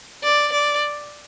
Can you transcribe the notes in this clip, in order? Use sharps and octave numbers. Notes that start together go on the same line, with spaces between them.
D5
D5